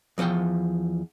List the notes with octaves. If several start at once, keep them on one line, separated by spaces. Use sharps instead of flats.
E2 F3 B4 F#5 G5